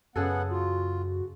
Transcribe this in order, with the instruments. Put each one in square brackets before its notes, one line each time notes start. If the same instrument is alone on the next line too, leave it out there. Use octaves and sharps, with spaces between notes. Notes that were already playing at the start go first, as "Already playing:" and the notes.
[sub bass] F#2 [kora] C#3 G#4 A4 [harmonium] B3 F#5 [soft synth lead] F#6
[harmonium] F4 [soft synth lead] F#4